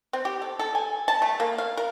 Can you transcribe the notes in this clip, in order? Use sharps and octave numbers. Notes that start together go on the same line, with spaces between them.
C4
G4
A4
A4
G#5
A5
A3
A#3
F5
A#4